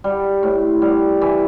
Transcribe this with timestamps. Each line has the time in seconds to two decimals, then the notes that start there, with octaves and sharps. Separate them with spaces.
0.04 G3
0.43 A2
0.82 G3
1.21 E3